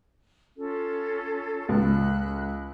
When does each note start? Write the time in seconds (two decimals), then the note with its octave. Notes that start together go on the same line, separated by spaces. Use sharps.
0.56 C#4 F4 A4
1.69 C#2 B5 F#6